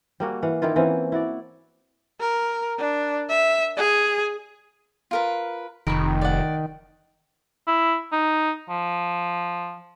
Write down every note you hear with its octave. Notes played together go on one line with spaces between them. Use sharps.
G3 A#3 F#4 G#4
E3 F5 F#5
D#3 A#3 E4 F4
E3 C4 C#4 F#4
E4 F#4 D5
A#4
D4
E5
G#4
F4 A#4 B4
F1 D#3 A#4 B5 C#6
D5 F#5
E4
D#4
F3